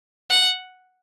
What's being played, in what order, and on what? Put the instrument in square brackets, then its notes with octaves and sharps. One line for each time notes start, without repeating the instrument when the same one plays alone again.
[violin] F#5